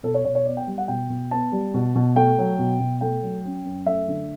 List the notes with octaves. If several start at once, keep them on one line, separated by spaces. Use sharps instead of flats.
B2 A4
C#5
B2 C#5
C#5
B3 D5
G5
G3
F#5
B2 G5
B2
B3 A5
G3
B2
B2
A3 G5
F#3
B2
B2
A3 G5
F#3
C#4
F#2
A3 E5
D3